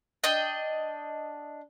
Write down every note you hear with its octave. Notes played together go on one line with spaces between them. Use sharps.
D4 D#5 G5